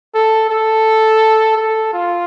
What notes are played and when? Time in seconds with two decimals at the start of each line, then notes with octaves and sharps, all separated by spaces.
0.15 A4
0.50 A4
1.57 A4
1.94 F4